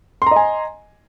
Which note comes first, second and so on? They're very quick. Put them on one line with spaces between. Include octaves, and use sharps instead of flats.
C6 A#5 D#5 G#5